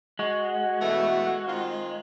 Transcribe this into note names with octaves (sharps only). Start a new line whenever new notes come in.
G#3 F#4
B2 E3 A3
D#3 C4 F4